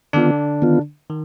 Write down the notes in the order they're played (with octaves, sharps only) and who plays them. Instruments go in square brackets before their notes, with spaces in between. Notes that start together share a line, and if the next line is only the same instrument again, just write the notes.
[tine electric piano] D3 D4 [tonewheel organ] D#3 B3 F4
[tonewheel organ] D#3 B3 F4
[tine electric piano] D#3